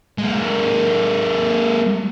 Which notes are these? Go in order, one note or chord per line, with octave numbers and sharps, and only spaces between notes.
G#3 A#3